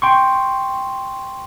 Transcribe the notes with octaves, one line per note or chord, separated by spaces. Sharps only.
G5 C6 C#6